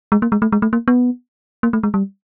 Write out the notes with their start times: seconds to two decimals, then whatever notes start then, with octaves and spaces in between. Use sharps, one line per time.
0.12 G#3
0.22 A#3
0.32 G#3
0.42 A3
0.52 G#3
0.62 A3
0.73 A#3
0.88 B3
1.63 A#3
1.73 A3
1.83 G#3
1.94 G3